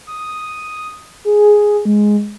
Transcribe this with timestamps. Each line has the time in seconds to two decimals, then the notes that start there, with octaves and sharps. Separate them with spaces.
0.07 D#6
1.25 G#4
1.85 G#3